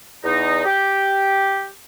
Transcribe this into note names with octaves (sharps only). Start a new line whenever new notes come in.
E2 D#4
G4